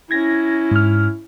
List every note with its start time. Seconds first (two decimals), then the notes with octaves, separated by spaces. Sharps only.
0.11 C#4 E4 G#6 A#6
0.72 G#2 F6